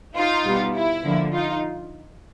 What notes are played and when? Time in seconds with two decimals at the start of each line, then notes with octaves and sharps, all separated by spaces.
0.16 D#4 F4
0.45 B2 G3 B3
0.74 E4
1.04 D3 F3 A#3
1.33 D#4 F4